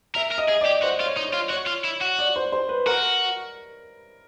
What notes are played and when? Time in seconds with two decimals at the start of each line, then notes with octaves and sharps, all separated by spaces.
0.15 A#4 E5
0.32 A#4
0.38 D#5
0.49 G#4
0.61 D5
0.66 G4
0.83 F#4 C5
1.01 F4
1.06 C#5
1.17 D#4
1.29 C#5
1.34 F4
1.50 F#4 C#5
1.67 F4
1.85 E4
2.01 F#4
2.19 D5
2.36 C5
2.52 C5
2.69 B4
2.86 F#4 A#4